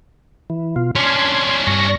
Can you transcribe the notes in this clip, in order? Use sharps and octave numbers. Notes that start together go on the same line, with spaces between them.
E3
B2 F4
C#4 D4 C6 G#6
G2 C#6 A#6